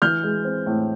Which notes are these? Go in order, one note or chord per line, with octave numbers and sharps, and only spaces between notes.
E3 F6 G6
G#3
C4
A2